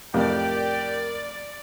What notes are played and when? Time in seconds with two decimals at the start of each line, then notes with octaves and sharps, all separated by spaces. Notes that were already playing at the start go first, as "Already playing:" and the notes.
0.14 F2 A2 C3 G4 A#4 D5 G5